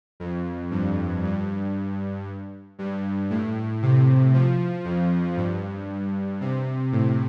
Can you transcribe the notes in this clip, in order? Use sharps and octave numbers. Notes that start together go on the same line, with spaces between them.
F2
G2
G2
G2
A2
C3
F3
F2
G2
C3
A2